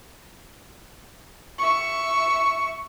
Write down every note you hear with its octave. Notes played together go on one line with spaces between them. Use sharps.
E5 C#6